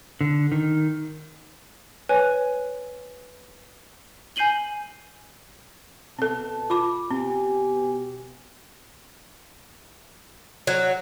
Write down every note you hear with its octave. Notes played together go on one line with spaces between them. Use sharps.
D3
D#3
B4 C#5 G#5 F#6
G#5 G6 C7 D#7 F#7 G7
B2 C4 A4 A5
F4 B5 D6
B2 C4 G4 G#5
F#3